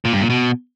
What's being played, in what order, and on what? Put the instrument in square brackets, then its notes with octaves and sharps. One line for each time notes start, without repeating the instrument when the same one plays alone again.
[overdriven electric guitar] A#2
G2
A#2
B2